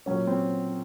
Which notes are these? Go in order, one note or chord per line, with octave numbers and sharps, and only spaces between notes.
A#2 F#3 C#4
C4